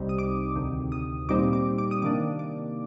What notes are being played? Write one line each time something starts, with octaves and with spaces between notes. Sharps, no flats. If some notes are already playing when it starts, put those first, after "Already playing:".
Already playing: C2 C3 G3 C4 D#4
D#6
D6
D2 C3 D#3
D#6
A#2 G3 C4 D#4 D6
D6
D6
D#6
C3 D#3 A#3 D4 D6
D6